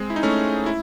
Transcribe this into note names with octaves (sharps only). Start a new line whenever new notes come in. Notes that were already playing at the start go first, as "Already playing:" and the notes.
Already playing: G#3 C4
E4
D#4
A3 C#4
E4